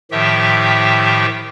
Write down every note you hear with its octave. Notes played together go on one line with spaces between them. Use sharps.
A2 D#3 F3 G4 E5 G5